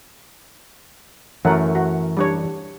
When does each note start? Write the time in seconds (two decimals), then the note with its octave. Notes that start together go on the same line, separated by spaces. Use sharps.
1.45 F#2 E3 F#3 A3 F#4 A#4 F#5
1.75 F#4
2.17 G3 D4 C#5